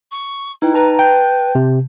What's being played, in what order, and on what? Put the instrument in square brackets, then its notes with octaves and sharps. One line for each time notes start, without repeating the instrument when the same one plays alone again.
[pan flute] C#6
[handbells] D#4 B4 G5 [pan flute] E4
[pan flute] B4 [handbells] A5 A#5
[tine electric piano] G5 [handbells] A5 G6
[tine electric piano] C3